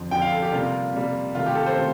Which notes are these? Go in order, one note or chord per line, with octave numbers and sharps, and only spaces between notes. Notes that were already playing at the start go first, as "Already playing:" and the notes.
Already playing: F2 D3 F3
F2 D3 F3 G5
F5
A4
G4
C3 G3 A#3 F4
C3 G3 A#3
C3 D#3 A3 F4
G4
A4
C5
C3 D#3 A3